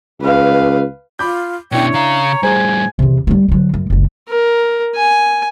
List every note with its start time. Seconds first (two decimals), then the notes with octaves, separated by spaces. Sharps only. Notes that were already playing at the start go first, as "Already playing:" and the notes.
0.22 C#2 B4 F5
1.19 F4 B5 D6 G6
1.72 B2 C#4 D4 E4 C#5 E5 G5
1.94 C#3 F5 A#5
2.43 A2 G3 G#4 C5 G#5
2.99 E2 C3
3.27 G3 A#3
3.48 D3 F#3
3.74 F#2
3.90 F#1 C#2
4.29 A#4
4.96 G#5